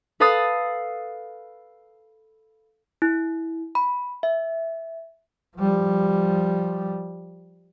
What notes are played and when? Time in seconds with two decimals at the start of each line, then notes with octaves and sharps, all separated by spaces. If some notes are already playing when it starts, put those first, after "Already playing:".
0.20 A4 B4 F5 B5 D#6 A6
3.02 E4
3.75 B5
4.23 E5
5.57 F3 G3